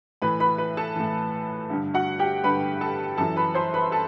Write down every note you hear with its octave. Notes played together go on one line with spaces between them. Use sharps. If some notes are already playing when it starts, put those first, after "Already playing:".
A2 E3 B4 B5
B4 B5
B4 B5
A4 A5
A2 E3
G2 D3
F#4 F#5
G4 G5
G2 D3 B4 B5
A4 A5
F#2 E3 A4 A5
B4 B5
C5 C6
B4 B5
A4 A5